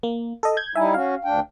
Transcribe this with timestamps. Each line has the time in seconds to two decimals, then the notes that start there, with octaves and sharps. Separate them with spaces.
0.03 A#3
0.43 A4 D#5
0.57 G6 G#6
0.75 G3 D#4 E4 E5 G#5
0.94 C#4 F#4 F5
1.24 D2 D4 G5